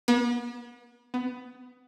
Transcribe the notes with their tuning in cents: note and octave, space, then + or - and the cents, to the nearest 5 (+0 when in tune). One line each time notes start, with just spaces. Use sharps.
B3 -40
B3 +20